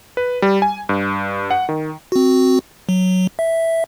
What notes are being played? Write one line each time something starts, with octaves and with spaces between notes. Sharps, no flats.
B4
G3
G#5
G2
F#5
D#3
C4 F#4
F#3
E5